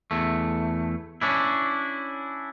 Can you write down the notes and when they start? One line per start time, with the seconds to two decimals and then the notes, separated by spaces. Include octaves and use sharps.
0.11 E2 A3
1.21 C#4 D4 E4